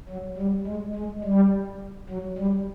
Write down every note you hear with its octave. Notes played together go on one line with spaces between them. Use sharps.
F#3
G3
G#3
G#3
G3
F#3
G3